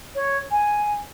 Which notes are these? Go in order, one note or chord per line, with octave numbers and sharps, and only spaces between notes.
C#5
G#5